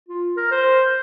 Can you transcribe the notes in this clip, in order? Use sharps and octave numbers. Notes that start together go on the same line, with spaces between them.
F4
A#4
C5